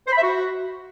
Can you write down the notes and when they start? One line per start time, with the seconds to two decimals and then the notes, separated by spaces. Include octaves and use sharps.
0.07 C5
0.12 B5
0.18 E5
0.23 F#4